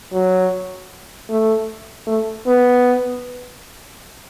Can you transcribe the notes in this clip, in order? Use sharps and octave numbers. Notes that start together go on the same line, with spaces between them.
F#3
A3
A3
B3